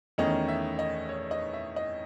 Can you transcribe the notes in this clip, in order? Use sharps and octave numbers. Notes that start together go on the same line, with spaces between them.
E2 D#3 A3 C#4 D#5
E5
D#5
C#5
D#5
E5
D#5